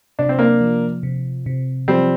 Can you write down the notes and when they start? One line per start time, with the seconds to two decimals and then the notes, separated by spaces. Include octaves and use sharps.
0.19 C3 D4
0.29 C4
0.39 A#3 D4
0.61 F3
1.03 C3
1.46 C3
1.88 F3 G3 C4